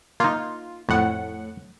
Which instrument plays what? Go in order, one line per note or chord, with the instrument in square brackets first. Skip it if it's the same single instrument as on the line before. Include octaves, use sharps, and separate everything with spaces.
[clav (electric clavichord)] A#3 D#4 [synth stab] F4
[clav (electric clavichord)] F2 [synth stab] A2 F#5